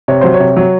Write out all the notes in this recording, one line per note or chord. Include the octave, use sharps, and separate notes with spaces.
C3 C#5
F#3 C5
C#5
C3
F#3